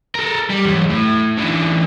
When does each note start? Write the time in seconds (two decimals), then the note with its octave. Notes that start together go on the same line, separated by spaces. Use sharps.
0.15 A4 A#4
0.50 G3
0.65 E2 F#3
0.89 A2
1.38 D3 E3